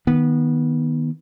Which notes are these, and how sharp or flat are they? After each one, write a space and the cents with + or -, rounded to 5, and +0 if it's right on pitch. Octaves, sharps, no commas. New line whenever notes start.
D#3 +0 B3 -20